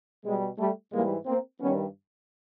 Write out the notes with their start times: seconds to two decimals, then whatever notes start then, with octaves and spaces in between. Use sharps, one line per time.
0.24 B2 G3 G#3
0.58 G3 A3
0.92 G#2 E3 G3 G#3 A#3
1.26 A#3 C4
1.60 G2 D#3 G3 B3 C#4